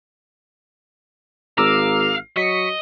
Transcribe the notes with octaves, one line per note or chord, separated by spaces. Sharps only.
G#1 F5 A#5 D6 E6
F#3 D#5 C#6 B6 C#7